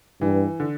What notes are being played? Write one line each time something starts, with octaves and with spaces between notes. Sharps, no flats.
G2 E3
D3